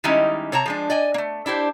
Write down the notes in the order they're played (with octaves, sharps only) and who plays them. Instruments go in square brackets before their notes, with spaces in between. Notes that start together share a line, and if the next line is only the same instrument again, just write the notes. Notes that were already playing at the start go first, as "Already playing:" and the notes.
[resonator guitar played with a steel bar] D#3 G3 G#3 C#4 D#4 E4
C3 C#5 A5 A#5
F3 G#3 D4
D5 D#5 G#5
A3 A#3
D4 E4 G4 C5